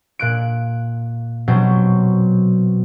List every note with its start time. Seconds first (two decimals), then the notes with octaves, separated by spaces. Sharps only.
0.19 A#2 F#6 D7
1.48 B2 F#3 C4